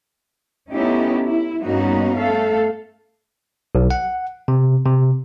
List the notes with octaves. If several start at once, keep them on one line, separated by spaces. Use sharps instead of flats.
A3 B3 C#4 D#4 E4 G4
E4
G2 A#3 B3 C#4 D#4 F#4
A3 A4 F5
B1
F#5
C3
C3